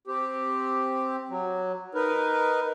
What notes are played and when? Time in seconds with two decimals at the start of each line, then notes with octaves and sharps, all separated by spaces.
0.07 C4 G4
1.29 F#3
1.95 D#4 A#4 B4